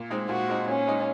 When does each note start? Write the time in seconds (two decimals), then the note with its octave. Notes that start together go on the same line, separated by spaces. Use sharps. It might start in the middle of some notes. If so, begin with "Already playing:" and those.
Already playing: A#2
0.10 G#3 C4 D#4
0.29 A#2 F#4
0.48 G#3 C4 D#4
0.68 A#2 C#4
0.87 G#3 D#4